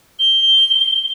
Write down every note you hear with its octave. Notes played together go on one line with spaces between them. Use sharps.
G7